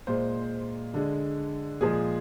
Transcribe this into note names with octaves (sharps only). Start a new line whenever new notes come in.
A#2 G#3 C5
D3 G#3
A#2 F3 G#3 G#4